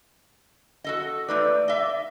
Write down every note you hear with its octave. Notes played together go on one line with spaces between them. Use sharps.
F#4 A4 D#5
A3 D#4 B4 D5
D#5 E5